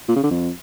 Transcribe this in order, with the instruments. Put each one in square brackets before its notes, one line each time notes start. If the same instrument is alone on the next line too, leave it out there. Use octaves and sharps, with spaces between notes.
[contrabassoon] A#2
C#3
D3
F2